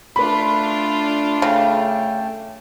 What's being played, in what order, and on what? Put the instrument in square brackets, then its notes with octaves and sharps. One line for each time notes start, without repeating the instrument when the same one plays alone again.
[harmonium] A3 [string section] D4 F4 [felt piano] B4 B5
[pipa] C#3 [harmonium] A3 G5 A5